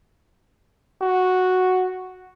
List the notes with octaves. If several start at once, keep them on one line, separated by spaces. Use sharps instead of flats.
F#4